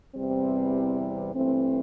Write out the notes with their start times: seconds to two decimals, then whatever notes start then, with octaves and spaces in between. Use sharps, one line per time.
0.16 E2 C3 E3 G3 C4
1.35 G2 E3 A3 C4